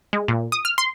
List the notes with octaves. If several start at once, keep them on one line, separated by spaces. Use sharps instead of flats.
G#3
A#2
D#6
F6
C6